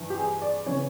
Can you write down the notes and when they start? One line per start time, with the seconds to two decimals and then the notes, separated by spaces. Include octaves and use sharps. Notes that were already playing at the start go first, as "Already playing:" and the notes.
Already playing: G2 E3
0.10 G4
0.17 G#4
0.42 D5
0.66 C#3 E3 C#5